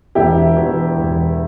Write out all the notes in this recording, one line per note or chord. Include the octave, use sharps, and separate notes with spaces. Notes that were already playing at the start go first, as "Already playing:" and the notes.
E1 E4 G4
E2
E1